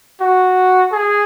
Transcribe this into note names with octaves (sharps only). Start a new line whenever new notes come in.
F#4
G#4